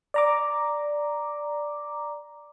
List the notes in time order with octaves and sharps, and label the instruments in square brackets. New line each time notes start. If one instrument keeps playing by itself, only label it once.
[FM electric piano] D5 A#5 D6